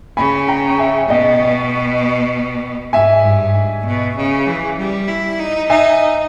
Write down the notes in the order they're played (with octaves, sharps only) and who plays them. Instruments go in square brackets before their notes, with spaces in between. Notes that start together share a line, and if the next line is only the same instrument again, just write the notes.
[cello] C#3 [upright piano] G#5 B5
[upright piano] G5 A#5
G5
E5 G#5
[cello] B2 [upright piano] D#5 G5
[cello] G#2 [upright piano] E5 G#5
[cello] G2
G#2
B2
C#3
E3
G3
E4
D#4
[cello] D#4 [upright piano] E5 G#5